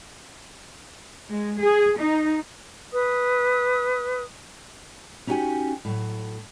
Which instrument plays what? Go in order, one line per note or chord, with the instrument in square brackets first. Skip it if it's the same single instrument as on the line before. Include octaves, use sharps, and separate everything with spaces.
[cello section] G#3
G#4
D#4
[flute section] B4 D#6
[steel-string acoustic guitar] C#4 D#4 E4 F#4 G4 G#5
A2 F#3